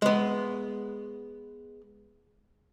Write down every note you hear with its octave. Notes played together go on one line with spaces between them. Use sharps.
G#3 B3